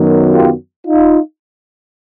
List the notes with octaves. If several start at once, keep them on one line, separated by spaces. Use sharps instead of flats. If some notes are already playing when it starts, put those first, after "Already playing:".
Already playing: F#2 D#3 F#3 B3
F4 G4
D#4 F4